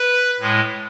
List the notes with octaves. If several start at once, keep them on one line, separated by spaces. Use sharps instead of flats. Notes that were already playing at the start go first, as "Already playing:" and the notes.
Already playing: B4
A2 G#3